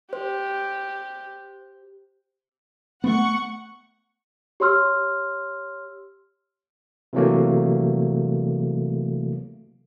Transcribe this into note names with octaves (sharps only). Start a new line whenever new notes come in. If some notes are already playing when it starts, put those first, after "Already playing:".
G4 C5
A3 B3 F#5 C#6
G4 C#5 C6 E6 F6
C3 E3 F#3 A3 A#3